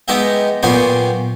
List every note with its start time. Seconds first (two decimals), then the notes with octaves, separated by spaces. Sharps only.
0.08 G#3 B3 D#4 G4 D#5 E5
0.63 A#2 F#3 B3 G4 G#4 C5